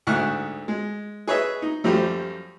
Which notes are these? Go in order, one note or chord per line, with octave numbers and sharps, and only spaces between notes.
D2 G#2 E4 F#5 C#6 F6
G#3
G#4 B4 C#5 D#5 E5
D#4
F#2 F3 G3 A3 G4